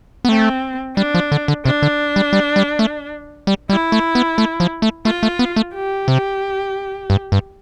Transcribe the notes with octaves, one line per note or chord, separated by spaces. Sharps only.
B3
A3 C4
G3 D4
F3
D3
D3
C3 D4
D3
G3
G3
G3
A3
G3
G3 E4
A3
B3
A3
F3
A3
A3 F4
A3
B3
A3
G4
C3
G2
G2